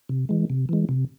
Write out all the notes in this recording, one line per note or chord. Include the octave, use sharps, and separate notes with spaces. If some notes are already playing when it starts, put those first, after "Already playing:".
C3
E3 G#3
C3
E3 G#3
C3